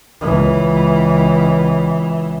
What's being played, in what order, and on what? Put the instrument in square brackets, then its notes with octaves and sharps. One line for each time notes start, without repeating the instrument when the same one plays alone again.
[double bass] C#2 E3